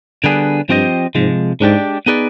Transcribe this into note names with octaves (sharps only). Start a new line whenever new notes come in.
D3 G3 B3 D4 G#4
G2 F3 C4 G4 C5 D#5
G#2 C3 F3 G#3
G#2 G#3 D4 G4 D5
B3 D#4 G#4 B4 D5